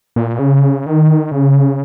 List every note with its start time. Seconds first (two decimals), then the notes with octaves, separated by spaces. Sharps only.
0.16 A#2
0.39 C#3
0.86 D#3
1.32 C#3